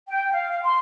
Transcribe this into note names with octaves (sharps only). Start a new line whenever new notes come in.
G5
F5
F5
C6